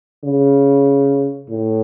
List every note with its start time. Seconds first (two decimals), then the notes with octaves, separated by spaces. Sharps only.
0.24 C#3
1.50 A2